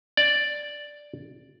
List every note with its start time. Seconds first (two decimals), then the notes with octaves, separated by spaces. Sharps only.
0.17 D5